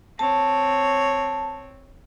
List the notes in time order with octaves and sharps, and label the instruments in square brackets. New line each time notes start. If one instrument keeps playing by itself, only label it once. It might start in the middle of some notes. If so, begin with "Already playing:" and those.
[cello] C4 C#5 [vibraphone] A5